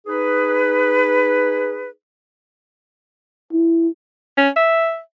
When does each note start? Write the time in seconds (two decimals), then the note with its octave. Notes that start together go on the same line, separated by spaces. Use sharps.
0.07 D#4 G#4 B4
3.52 E4
4.37 C#4
4.56 E5